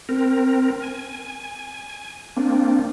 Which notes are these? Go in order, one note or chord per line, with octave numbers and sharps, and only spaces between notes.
C4 A#4
G#5
A#3 C4 D4